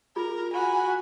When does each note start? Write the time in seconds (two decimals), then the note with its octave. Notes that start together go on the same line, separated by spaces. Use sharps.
0.16 F4 G#4 A#4
0.54 F#4 G#5 B5